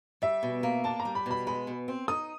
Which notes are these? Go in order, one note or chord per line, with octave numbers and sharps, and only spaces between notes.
G3 E5
B2
A#3
D4 A5
A#5
G3
B5
B2 B5
G#3 B5
B2
C4
D#4 D#6